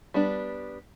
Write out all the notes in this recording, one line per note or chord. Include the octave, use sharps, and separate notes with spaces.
G3 B3 D4